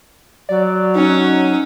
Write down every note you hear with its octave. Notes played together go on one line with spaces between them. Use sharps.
F#3 D5
C#4 D#4